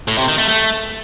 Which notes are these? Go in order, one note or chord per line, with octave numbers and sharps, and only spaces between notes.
A2
C3
D#3
A3
A3